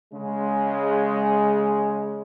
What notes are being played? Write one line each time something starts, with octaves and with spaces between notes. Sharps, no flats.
C#3 G#3